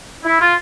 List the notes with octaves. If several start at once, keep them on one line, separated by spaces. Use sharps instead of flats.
E4
F4